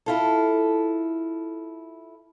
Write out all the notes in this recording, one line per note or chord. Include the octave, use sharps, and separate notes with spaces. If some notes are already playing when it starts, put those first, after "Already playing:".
E4 F4 A4